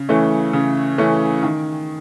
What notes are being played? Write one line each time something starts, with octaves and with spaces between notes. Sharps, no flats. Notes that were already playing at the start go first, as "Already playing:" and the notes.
Already playing: C#3
E3 A3 C#4
C#3
E3 A3 C#4
D#3